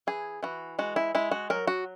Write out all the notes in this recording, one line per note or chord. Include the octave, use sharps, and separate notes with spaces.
E3 G#4
E3 F#4
G#3 F#4
E4
G#3 E4
F#4
F#3 A#4
F#4